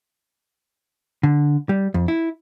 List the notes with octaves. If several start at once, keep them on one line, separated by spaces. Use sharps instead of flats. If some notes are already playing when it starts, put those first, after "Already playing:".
D3
G3
F2
E4